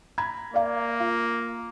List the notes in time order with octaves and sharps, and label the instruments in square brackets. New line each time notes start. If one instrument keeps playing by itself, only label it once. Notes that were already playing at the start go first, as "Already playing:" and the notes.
[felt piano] A#5 B5 G#6
[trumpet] A#3 [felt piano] D5 F5
[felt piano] F4